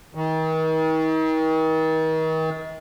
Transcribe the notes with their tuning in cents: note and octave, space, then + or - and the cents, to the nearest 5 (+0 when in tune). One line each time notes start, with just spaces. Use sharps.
D#3 +40